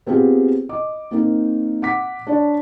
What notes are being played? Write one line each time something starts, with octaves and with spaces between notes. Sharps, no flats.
B3 C4 F4 G4 G#4
D#5 D6
A#3 C4 D#4 A#4
F#5 D6 B6
D4 C#5 D5